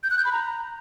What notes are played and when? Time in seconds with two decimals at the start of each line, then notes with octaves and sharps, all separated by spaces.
0.03 G6
0.11 F#6
0.18 G6
0.25 B5
0.32 A#5